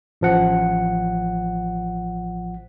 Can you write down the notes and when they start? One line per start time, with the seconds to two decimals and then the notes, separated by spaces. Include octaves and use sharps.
0.21 A1 F3 F#5